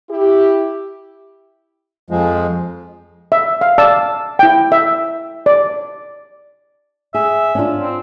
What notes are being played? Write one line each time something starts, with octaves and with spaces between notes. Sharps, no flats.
E4 G4
F2 F3 G#3
E5
F5
D5 F5 A5 E6
E4 G5
E5
D5
G#4 E5
C#4 D4 F4
C4